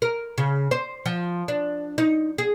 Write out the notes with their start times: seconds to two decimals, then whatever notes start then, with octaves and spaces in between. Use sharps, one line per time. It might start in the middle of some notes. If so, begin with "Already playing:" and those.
0.02 A#4
0.38 C#3
0.71 C5
1.06 F3
1.48 D4
1.98 D#4
2.38 G#4